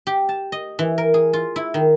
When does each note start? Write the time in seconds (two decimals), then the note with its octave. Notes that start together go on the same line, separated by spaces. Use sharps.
0.07 G4
0.29 A5
0.52 D#5
0.79 E3
0.98 A#4
1.14 G#4
1.33 F4
1.56 E4
1.74 D#3